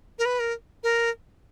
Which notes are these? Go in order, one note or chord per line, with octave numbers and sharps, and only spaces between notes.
A#4
B4
A#4
A#4